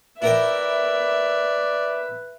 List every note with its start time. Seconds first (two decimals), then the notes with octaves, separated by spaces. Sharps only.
0.22 E4 A#4 B4 D5 E5 G5